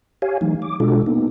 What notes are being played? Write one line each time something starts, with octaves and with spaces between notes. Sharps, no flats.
G4 C#5 F5 G#5
E3 F#3 A3 D#4
D6
B2 G#3 D4 F4 F#4 A4
A#3 B3 D#4